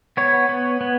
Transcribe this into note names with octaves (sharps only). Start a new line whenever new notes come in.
B3 C#5
B3
B3